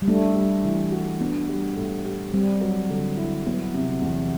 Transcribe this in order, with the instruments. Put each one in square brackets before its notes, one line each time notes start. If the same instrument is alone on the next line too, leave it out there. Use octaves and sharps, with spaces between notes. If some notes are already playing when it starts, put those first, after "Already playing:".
[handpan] G3
[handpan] A3 [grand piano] D4
[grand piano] G3
E3
F#4
[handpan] B3 [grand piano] D4
[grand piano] G3
A2
G4
[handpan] G3 [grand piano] C4
[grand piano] F#3
D3
E4
[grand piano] F#3 [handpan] B3
[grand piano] C3
E2